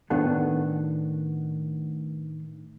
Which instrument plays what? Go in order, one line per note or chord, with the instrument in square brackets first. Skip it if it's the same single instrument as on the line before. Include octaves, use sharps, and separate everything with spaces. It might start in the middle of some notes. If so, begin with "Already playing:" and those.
[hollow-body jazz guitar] A2 D#3 B3 D4 F#4 A4